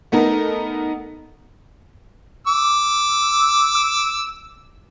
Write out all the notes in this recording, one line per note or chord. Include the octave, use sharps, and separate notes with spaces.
A3 B3 D#4 A4 A#4
D6 E6